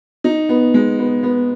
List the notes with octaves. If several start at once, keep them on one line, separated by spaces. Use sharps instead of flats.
D#4
B3
G#3
B3
B3